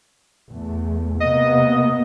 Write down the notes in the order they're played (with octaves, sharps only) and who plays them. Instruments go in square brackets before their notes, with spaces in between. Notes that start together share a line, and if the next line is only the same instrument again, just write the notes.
[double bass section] E2 A3
[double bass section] C3 A#3 B3 [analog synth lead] D#5